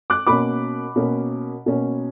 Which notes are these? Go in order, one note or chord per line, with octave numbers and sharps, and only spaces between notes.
D6 F#6
B2 A#3 C#4 B5 D6
B2 A#3 C#4
B2 A#3 C#4